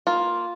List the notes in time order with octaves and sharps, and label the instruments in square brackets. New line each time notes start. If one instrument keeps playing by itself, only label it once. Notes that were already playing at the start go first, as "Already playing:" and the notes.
[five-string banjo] A#3 F4